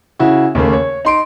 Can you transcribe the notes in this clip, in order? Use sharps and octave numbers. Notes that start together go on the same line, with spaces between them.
C#3 E4 F#4
D#2 C#3 A3 A#3
C#5
D#4 C6 D7